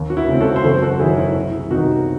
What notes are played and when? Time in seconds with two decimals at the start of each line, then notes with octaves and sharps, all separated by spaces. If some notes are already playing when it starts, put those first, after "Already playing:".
Already playing: D#2
0.10 F#4
0.17 E4
0.28 C#3 G#3 C4
0.40 F#4 A4
0.56 C5
0.64 F#1 F#4 A4
0.82 F#4 A4
1.00 F#2 D#3 F#3 E4 G#4
1.17 E4
1.35 C2 E4
1.71 C3 D#3 D#4 F#4